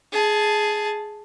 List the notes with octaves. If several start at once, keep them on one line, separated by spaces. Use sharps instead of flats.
G#4 A5